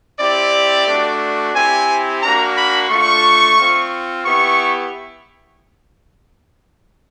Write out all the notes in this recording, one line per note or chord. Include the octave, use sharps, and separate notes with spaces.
C4 E4 G4 D5
A3 D4 F#4
C4 E4 G4 G#5
A#3 D4 F#4 A#5
B5
A3 D4 F4 C#6
C4 F4
B3 E4 G4 C#6